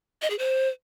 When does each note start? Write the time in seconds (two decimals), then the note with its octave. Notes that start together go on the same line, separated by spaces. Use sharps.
0.22 D#5
0.30 G#4
0.39 C5